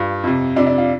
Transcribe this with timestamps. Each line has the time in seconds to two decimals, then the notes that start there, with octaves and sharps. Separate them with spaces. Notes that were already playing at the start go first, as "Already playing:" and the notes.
Already playing: G2 F4
0.23 F2 C3
0.56 F2 C3 D4
0.67 D4
0.78 F4